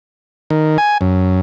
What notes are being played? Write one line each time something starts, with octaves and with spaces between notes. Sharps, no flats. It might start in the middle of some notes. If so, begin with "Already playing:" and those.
D#3
G#5
F#2